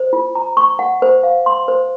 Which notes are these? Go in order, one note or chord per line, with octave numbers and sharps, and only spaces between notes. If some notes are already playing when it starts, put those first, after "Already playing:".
Already playing: C5
F4
A#5
C#6
F#5
C5
F5
C6
C5